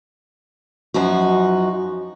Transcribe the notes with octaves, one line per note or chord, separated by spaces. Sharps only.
F#2 F3 D#4 F#4